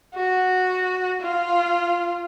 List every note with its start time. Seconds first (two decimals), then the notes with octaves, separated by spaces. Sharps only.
0.15 F#4
1.22 F4